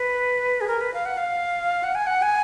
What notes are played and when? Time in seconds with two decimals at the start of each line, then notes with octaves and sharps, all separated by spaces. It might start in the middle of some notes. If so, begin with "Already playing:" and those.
Already playing: B4
0.61 G#4
0.68 A#4
0.81 B4
0.94 F5
1.05 F#5
1.17 F5
1.83 F#5
1.95 G#5
2.07 F#5
2.22 G#5